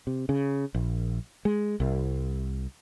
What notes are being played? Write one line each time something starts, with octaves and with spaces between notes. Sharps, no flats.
C3
C#3
A#1
G#3
C2